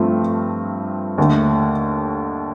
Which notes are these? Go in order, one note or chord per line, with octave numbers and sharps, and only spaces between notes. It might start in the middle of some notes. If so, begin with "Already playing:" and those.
Already playing: G2 F3 A3 C4
D#2 D3 A3